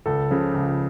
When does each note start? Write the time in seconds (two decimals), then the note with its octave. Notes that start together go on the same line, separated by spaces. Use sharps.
0.06 C#2 A4
0.30 C#3 F3
0.54 C#2